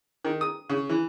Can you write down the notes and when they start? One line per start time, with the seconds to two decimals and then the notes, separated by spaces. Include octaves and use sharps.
0.24 D#3
0.41 D#6
0.70 C#3
0.89 E3